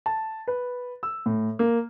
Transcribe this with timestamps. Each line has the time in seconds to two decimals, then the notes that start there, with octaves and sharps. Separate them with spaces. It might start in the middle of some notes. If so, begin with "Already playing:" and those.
0.06 A5
0.48 B4
1.03 E6
1.26 A2
1.59 A#3